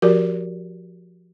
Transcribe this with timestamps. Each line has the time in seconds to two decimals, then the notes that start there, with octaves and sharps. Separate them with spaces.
0.02 F3 F#4 G4 A#4 D5